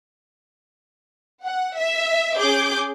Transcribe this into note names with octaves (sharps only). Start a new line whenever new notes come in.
F#5
E5
C#4 G#4 D6 G6 D7